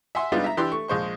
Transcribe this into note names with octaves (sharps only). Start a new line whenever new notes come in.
E5 F#5 G#5 C6 E6
G3 G#3 B3 D4 D#4 F4
E5 A#5
E3 D4 G4 B4 C6 E6
A3 C#6
A#1 G#3 C5 C#6